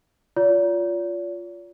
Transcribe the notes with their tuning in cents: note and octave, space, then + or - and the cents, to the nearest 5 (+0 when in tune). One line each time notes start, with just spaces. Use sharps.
F4 +0 D5 -45